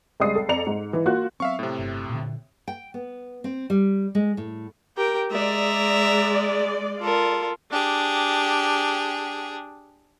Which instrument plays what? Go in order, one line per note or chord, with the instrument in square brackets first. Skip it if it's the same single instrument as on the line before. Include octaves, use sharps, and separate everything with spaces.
[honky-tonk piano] C#2 G3 G#3 D5 D#6 C7
A4
F2 D5 A#5 C#7 F7
G#2
E3
A#3 F4 F#4 F#6
[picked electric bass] F#3 B3 C4 [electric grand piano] E5 F5 C#6
[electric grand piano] A2 C3
[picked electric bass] G1
A#2 D3
[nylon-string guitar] G5
B3
C4
G3
G#3
A2
[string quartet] G4 A#4 G5
[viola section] G#3 D5 [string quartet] E5 A#5
[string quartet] F4 A4 A#4
D4 G4 G#4